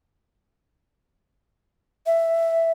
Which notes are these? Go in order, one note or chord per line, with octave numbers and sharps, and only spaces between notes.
E5